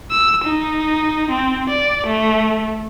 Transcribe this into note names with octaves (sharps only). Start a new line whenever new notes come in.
E6
D#4
C4
D5
A3